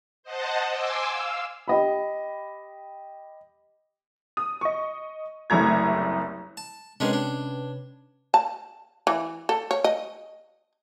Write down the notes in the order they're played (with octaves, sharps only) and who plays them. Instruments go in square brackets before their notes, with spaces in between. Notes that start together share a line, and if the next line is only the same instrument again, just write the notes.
[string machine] C5 D#5 F#5 A5
G#5 C6 D6 E6
F5 E6
[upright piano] G4 D#5 B5
[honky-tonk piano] D#6
D#5 C#6
F#1 C2 A3 A#5 G#6
[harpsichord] A5
[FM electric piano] C3 C#4 B4 [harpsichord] D#3 G#3 D4
[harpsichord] D4
[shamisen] A5
E3
A4
C#5
D#5